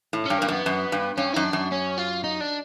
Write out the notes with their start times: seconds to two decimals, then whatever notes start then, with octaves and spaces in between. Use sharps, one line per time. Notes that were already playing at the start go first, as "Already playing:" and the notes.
0.13 A2
0.25 G2 C#4
0.38 G2 A#3
0.48 F#2 B3
0.66 F#2
0.92 G2
1.17 G2 C#4
1.34 F#2 D#4
1.44 D4
1.53 F#2
1.71 C#4
1.98 F4
2.24 D#4
2.41 D4